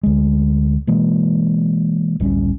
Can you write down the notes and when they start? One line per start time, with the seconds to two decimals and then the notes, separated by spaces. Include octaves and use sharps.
0.03 D2 G#3
0.87 B2 E3 G#3 A#3
2.20 D1 A1 G3 C#4